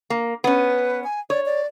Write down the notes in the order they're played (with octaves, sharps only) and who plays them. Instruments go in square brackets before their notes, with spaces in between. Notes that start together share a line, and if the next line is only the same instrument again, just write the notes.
[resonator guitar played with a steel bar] A#3
[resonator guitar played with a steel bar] B3 C#4 [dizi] B4
[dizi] G#5
[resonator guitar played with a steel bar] C#5 [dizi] D5
[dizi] D5